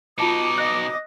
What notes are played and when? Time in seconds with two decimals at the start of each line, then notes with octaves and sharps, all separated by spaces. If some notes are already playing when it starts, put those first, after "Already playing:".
0.18 B2 D#4 F4 A5 D6 D#6 C#7
0.58 D#5 F#6